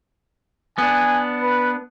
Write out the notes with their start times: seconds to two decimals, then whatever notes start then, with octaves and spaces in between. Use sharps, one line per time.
0.78 B3 D4 G#5
1.42 B4